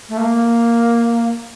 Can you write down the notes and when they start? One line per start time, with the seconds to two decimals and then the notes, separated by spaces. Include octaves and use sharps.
0.09 A3
0.17 A#3